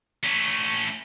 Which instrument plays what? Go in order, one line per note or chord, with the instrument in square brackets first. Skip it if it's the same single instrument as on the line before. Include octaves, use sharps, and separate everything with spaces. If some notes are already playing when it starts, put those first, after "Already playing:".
[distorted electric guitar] A3 C#4